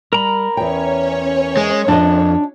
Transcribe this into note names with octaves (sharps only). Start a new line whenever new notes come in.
G3 A#4 A#5 B5
E2 C#4 C#5 G5
G#3
F2 D4 F4 D#5